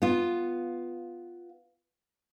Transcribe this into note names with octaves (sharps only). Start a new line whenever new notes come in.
B3 F4